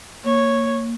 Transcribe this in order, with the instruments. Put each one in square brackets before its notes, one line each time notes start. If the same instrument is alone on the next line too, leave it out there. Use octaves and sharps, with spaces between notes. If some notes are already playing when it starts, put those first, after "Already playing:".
[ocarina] A#3 [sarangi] C#5